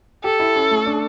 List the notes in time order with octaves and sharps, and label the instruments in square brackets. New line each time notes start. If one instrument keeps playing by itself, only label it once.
[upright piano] G4 [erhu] A4
[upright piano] E4
C#4
A3
D4